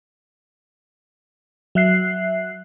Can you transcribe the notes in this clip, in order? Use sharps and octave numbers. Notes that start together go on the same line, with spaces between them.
F#3 E5 F#6 C7